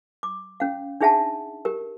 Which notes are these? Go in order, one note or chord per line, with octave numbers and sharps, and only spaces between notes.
D6
C#4 F5
D4 D#4 G#4 E5 F#5 A5
G4 A#4